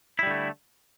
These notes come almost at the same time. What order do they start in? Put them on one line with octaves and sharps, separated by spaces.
E4 G3 D3 A3